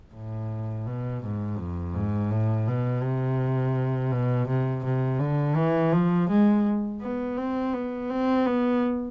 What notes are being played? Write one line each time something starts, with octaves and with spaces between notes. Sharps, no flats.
A2
B2
G#2
F2
G#2
A2
B2
C3
B2
C3
C3
D3
E3
F3
G#3
B3
C4
B3
C4
B3